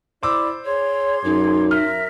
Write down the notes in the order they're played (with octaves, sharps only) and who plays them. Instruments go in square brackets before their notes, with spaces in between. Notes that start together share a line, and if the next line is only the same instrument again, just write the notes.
[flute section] E4 D5 B5 [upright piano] C5 D6 E6
[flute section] G#4 C6 G#6 [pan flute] C#5
[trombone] F#2 [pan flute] D#4
[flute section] A#4 E5 [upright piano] F6